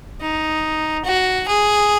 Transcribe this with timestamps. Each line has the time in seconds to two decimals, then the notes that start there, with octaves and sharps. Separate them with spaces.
0.21 D#4
1.05 F#4
1.48 G#4